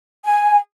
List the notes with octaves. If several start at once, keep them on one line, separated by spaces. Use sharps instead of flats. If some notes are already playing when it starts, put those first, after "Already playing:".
G#5